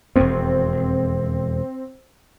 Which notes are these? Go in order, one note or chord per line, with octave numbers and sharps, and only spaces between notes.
E1 F2 C4